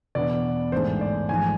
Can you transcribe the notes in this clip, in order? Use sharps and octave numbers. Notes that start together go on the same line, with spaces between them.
E2 B2 B3 D4 D5
A1 G#2 G#3 D4 C5
D5
A1 G#2 F3 G#3 G#5